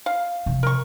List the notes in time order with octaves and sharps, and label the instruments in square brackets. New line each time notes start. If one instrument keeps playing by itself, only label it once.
[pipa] F5
[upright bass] C3 F3
[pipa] A#4 C#6